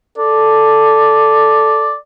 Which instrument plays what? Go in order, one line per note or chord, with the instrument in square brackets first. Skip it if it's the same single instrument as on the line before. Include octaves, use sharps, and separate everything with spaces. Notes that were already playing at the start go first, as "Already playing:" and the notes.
[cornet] A4 [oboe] D5